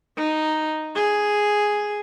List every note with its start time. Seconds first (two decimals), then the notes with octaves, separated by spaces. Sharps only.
0.17 D#4
0.95 G#4